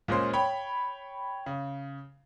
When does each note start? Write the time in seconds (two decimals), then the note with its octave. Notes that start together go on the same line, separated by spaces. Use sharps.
0.08 A#2 G#3 C#4 A#4 C5 C6
0.33 C#5 G5 B5
1.46 C#3